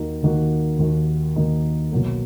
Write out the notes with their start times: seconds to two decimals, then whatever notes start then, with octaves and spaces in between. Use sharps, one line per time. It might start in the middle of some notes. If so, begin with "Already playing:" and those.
Already playing: D#2 D#3 A#3 D#4 F#4
0.23 D#2 D#3 A#3 D#4 F#4
0.79 D#2 D#3 A#3 D#4 F#4
1.36 D#2 D#3 A#3 D#4 F#4
1.92 B1 B2 F#3 A#3